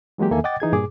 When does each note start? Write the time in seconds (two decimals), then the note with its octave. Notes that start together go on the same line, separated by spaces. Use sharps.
0.18 E3 F#3 G#3 A#3 G4
0.31 E2 D#3 A#3 A4 E5 G#5
0.44 D#5 F#5 G5 D6 A6
0.60 E3 D#4 G#4 G#6
0.73 G2 A#2 G#4 D6